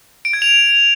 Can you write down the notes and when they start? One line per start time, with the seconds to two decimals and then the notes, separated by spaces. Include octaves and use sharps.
0.25 D7
0.33 G#6
0.42 F7